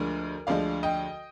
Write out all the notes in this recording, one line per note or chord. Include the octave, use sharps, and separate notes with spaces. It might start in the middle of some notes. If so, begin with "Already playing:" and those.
Already playing: D2 D3 F3 G#3 A#4 D5
D2 D3 F3 G#3 D5 F5
D#5 G5